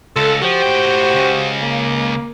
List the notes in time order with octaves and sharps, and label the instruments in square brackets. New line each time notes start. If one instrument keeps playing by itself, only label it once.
[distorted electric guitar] C#2 [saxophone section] F4 A4
[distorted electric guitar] F3 [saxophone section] F#4 G4 C5
[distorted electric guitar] A2 G5
C#2 C#3
[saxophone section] A#3